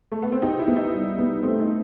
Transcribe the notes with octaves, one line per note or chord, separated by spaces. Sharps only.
A3
B3
C4
D#4 G4
E4
B3
D#4
G3
B3
A3 C4
D#4